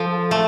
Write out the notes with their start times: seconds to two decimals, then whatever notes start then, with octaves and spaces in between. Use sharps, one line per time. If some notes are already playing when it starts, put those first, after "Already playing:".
Already playing: F3 A4
0.31 A3